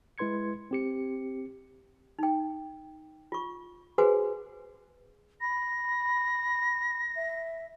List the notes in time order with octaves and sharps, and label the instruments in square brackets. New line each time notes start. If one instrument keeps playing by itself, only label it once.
[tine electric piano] G#3 E4 B4 C6 G#6 C#7
C4 G4 C#7
[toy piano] D#4 G5
F4 C#6
F#4 G#4 B4 C5 F#5 G#5
[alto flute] B5 [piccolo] A#6
[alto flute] E5